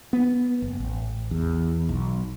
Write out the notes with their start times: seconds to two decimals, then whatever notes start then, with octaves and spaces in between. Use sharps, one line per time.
0.13 B3
0.62 F#1
0.80 A1
1.31 E2
1.89 B1